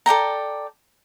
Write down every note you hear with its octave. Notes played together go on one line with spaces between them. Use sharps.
A4 D5 G5 A#5